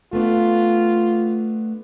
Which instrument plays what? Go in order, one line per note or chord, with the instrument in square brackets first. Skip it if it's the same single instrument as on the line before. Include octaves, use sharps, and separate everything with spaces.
[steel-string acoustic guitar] A3 B3 D4 [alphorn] F4